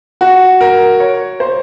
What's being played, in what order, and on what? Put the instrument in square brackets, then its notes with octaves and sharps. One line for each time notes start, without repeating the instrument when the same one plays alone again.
[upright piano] F#4
A#4
C#5
C5